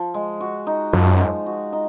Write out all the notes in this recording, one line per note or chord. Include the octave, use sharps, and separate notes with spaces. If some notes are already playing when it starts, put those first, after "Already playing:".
Already playing: F3
G#3
F#4
D#4
F#2 F3
G#3
F#4
D#4